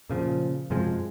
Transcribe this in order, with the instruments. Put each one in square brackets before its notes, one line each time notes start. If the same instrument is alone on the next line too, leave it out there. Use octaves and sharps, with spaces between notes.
[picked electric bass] A#2 C#3 F3
F#2 C3 F3 G#3